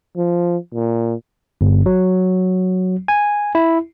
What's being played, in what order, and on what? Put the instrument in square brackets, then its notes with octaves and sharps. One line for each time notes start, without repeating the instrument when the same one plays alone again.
[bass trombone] F3
A#2
[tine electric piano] G1
F#3
G#5
E4